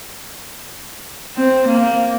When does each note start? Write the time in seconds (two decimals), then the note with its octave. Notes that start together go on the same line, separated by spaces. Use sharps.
1.36 C4
1.68 A#3